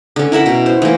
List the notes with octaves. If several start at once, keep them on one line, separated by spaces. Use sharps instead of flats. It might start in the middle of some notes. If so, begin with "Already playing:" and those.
D3 C#4
E4 A#4 E5 F#5
B2
C5
E3 A#3